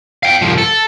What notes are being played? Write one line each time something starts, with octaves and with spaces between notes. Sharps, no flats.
F5 G5
C2 F3
A4